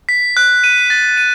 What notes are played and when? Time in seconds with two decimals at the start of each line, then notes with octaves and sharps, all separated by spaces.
0.09 B6
0.37 F#6
0.64 D#7
0.90 A6
1.17 D#7